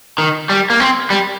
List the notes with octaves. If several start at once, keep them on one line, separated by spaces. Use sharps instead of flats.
D#3
G3
A#3
C4
G3